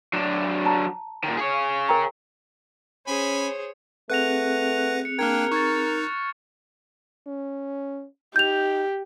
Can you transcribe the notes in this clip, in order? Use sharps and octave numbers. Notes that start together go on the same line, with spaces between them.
F#3 D4
A5 A#5
A#2 D#3
G#4 C#5
A#4 G5 A#5
C#4 G#4 C5 C#5 G#5 B5
A3 C4 G#4 B4 F#5 F#6 A#6 F7
C#7
A#3 D4 A#4 G5 F6 G#6
D#4 C#6 G#6 A6
C#4
D#4 G4 G6 F7